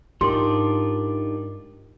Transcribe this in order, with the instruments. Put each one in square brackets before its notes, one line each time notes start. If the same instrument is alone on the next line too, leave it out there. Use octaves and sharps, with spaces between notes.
[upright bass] G#2 [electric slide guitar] D4 D#4 F4 [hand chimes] G4 A#4 D6 [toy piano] C6